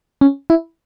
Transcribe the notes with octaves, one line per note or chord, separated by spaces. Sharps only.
C#4
E4